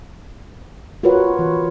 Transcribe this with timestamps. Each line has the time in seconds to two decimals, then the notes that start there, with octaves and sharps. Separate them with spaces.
1.03 F4 F#4 A#4 B4 C#5 F#5
1.39 E3